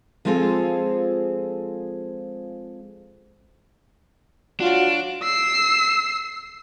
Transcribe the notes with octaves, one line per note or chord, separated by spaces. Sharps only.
F3 G#3 C4 F4 G#4 A4
F#3 D4 F4 F#4
E6 C7